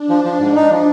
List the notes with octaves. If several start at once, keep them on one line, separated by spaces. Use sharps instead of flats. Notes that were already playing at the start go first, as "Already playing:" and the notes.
Already playing: D4
F3
F3
G#2
D#4
F3